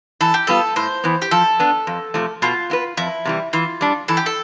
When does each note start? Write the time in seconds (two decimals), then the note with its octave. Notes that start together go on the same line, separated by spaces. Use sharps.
0.20 E3 A4
0.34 G4
0.47 G3 B3 F4 A4
0.76 A2 C5
1.04 E3 B3
1.22 G4
1.31 F3 A4
1.59 B3 D4
1.87 F2
2.14 C3 F3 A3
2.42 B2 F4
2.70 B3 E4 B4
2.97 F2 E4
3.25 C3 E3 G3
3.53 E3 F4
3.81 G3 D4
4.08 E3 A4
4.17 G4
4.26 A4